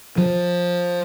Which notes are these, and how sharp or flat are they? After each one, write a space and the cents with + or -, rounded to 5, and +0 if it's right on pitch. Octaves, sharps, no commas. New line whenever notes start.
F3 +15